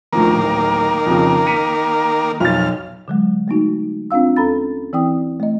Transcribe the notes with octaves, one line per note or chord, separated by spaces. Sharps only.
D2 D#3 F3 A#3 A#4
D1
F2 C#3
B6 C#7 D#7
B1 F2 F6 A6
D3 F#3 G#3
A3 A#3 D#4 F#4
C4 D4 F4 F5 E6
D#2 C#4 A4 A#5 B5 A6
E3 C4 E4 G5 D#6
A3 D#5